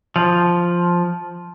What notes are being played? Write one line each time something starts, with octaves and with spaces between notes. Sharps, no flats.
F3